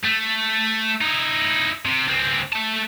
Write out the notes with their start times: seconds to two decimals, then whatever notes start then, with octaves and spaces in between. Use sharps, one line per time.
0.04 A3
1.01 D#4 E4
1.85 C3
2.08 C#2 C4
2.53 A3 A5